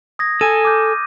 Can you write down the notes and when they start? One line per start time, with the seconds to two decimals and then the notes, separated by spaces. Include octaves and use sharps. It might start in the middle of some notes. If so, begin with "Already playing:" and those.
0.19 D#6 G#6 A#6
0.41 A4 G#5 D#7
0.65 D6 F6 G6